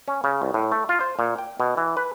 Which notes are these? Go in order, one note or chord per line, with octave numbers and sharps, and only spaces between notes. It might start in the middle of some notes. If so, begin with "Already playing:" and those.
C#4
C#3
C2
A2
A3
F4
C5
A#2
G5
B2
E3
B4